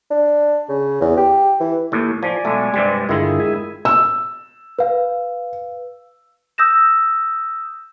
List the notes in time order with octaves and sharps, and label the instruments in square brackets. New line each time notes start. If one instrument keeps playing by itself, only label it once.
[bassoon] D4
C#3
E2
G4
E3
[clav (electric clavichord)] D#2 A2
[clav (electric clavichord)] F3 [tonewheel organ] D5 G#5
[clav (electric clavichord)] B1 A3 [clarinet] G#3
[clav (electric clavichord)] G2 C3 G3
[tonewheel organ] G2 D3 F4 [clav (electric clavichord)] D#3 E4 [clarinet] G#4
[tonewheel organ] G#3 E5 G#5
[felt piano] E6
[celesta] B4 F5
D#6 E6 G6 A#6 E7